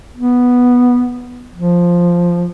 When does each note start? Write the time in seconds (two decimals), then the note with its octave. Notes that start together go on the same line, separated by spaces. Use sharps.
0.17 B3
1.55 F3